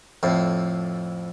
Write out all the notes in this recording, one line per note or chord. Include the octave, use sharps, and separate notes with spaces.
F2 A2